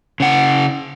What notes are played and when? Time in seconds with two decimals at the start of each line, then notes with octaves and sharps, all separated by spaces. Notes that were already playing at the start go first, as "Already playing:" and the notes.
0.20 C#3 F#5